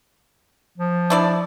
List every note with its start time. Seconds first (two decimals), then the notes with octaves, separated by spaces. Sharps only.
0.78 F3
1.10 D4 E4 D5